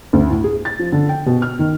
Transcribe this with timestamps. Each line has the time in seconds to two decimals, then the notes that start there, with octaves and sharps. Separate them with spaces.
0.13 D2
0.30 A2
0.44 G#4
0.65 A6
0.79 F3
0.92 D3
1.09 G5
1.26 B2
1.42 F6
1.59 D#3